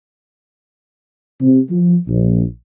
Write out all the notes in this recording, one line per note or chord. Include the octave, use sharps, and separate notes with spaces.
C3
F3
A#1